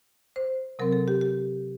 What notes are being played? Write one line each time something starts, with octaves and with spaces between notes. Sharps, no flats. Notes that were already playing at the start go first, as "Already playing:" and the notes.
C5
C3 F#3 C4 A#4
A4
G4
G4